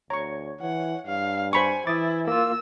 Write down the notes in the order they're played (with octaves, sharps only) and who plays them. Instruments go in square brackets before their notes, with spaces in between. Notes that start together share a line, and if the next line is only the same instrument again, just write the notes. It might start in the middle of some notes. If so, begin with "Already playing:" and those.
[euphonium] D2 [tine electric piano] C#5 [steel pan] A#5 C#6
[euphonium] E3 [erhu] F#5
[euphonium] G2 [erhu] F5
[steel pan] C5 B5 C#6 [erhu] G#5
[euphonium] E3 [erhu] E4 [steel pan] D6 D#6 [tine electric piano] A6
[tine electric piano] A#3 F4 [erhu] E6